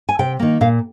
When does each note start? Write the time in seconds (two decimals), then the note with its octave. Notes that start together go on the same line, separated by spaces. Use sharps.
0.09 G#5
0.19 C3 G5
0.39 D#3 A#3
0.61 A#2 F5